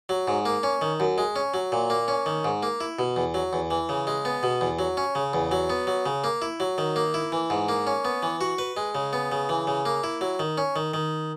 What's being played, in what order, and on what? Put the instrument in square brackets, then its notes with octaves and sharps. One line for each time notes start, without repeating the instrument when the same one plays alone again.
[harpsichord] F#3
G#2
A#3
C#4
D#3
F#2
G#3
C#4
F#3
A#2
A#3
C#4
D#3
G#2
A#3
E4
B2
E2
F#3
E2
E3
C#3
G#3
B3
B2
E2
F#3
C#4
C#3
E2
F#3
B3
F#3
C#3
A#3
E4
F#3
D#3
A#3
E4
E3
G#2
A#3
C#4
B3
E3
F#4
B4
G#3
C#3
B3
C#3
E3
C#3
A#3
E4
F#3
D#3
C#4
D#3
D#3